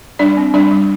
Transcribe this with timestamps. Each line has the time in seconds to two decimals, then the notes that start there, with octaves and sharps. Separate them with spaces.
0.19 G3 D4 D5
0.37 C4
0.54 G3 D4 D5
0.71 G3